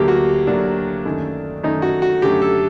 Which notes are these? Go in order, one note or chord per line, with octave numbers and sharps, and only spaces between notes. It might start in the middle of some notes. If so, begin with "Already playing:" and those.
Already playing: D2 D3 F#3 A#3 G4
F#4
D2 D3 F#3 A#3 D4
F#2 D#3 A3
F#2 D#3 A3 D#4
F#4
F#4
F#2 D3 F#3 A3 G4
A4